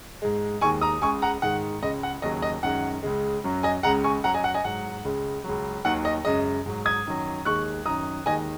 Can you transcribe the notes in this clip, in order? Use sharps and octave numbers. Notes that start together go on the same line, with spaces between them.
G#2 G#3
D#2 D#3 G#3 G#5 C#6
A#5 D#6
C#2 C#3 G#3 G#5 C#6
F#5 A#5
G#2 D#3 G#3 F#5
C#2 C#3 G#3 D#5
F#5
D#2 C#3 F#3 D#5
D#5
F#2 D#3 G#3 F#5
C#2 C#3 G#3
F#2 F#3
D#5 G#5
C#2 C#3 G#3 F#5 A#5
G#5 C#6
F#2 F#3 F#5 A#5
D#5 G#5
F#5
D#5 G#5
G#2 F#3 F#5
C#2 C#3 G#3
C#2 C#3 F#3
D#2 D#3 F#3 F#5
D#5
F#2 C#3 G#3 D#5
G#2 F#3
D#6 G#6
F#2 D#3 F#3
D#2 D#3 G#3 C#6 F#6
F#2 D#3 F#3 A#5 D#6
D#2 D#3 G#3 D#5 G#5